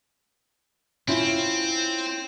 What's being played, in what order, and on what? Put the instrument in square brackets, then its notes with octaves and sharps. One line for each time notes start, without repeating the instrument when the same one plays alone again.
[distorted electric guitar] C4 [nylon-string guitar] C#4 E4 F4